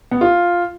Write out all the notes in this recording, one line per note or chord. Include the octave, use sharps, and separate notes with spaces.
B3
F4